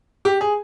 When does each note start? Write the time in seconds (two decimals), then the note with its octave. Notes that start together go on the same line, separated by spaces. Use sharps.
0.25 G4
0.41 G#4